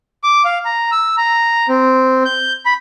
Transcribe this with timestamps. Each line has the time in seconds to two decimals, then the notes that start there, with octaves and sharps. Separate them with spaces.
0.24 D6
0.45 F5
0.65 A#5
0.92 E6
1.18 A#5
1.69 C4
2.25 G6
2.66 B5